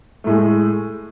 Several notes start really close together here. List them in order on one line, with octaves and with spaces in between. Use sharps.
A3 A2 G#3